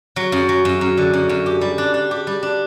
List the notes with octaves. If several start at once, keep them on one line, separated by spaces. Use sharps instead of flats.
F#3
F#2
F#3
F#2
F#2
D3
F#2
F#2
G4
G3
D4
D4
G4
G3
D4